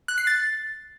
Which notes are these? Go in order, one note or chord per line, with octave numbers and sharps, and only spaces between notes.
F#6
C7
A6